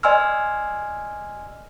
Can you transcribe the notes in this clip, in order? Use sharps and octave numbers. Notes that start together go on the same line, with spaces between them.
D5 D#5 G#5 C6 E6 F6